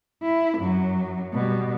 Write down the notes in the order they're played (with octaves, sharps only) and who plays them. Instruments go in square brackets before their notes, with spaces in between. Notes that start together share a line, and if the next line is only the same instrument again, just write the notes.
[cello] E4
F#2 F#3
B2 G3